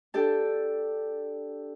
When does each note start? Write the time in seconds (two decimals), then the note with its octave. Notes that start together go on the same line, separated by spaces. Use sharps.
0.14 D4 G4 A4 G5